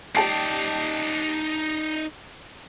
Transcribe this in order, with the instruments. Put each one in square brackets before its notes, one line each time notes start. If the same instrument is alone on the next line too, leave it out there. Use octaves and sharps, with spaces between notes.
[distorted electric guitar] D#4 D5 [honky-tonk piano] G4 A5 C7